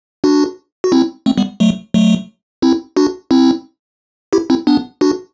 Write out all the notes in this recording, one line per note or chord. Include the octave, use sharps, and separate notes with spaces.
D4 F#4
F#4
C4 E4
A3 C4
G3 B3
F#3 A3
F#3 A3
C4 E4
D4 F#4
C4 E4
E4 G4
C4 E4
B3 D4
D4 F#4